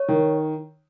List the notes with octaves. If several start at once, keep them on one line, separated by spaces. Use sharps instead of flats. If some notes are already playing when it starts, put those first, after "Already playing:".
Already playing: C#5
D#3